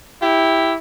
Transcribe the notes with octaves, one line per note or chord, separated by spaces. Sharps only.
E4 G4